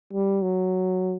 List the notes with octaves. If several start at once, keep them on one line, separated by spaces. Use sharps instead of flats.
G3
F#3